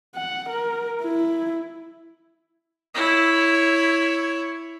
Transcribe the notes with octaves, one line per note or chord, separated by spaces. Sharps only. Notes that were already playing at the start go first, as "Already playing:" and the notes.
F#5
A#4
E4
E4 C#5